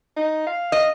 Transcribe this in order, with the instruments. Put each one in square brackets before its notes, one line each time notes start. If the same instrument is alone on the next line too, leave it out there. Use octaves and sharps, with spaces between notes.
[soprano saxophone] D#4
F5
[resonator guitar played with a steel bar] D#5